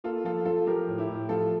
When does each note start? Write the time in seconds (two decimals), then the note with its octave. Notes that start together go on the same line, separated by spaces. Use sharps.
0.04 A#3 F4 A4
0.25 F3 F4 A4
0.45 F3 F4 A4
0.67 F3 G4 A#4
0.88 A2
0.98 E4 G4
1.09 A2
1.29 F3 F4 A4